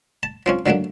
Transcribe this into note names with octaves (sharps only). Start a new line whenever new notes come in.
A5
F3 C4 C#4
D3 F#3 A3 A#3 D4